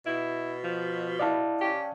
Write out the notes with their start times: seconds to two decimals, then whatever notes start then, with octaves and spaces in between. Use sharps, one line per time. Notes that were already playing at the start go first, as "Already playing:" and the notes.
0.06 B2 E4
0.64 F3
1.19 E4 D5 D#5 F5 A5
1.61 C#4 G4